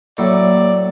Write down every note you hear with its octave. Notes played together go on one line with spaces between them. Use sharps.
A2 F#3 A#3 E4 D5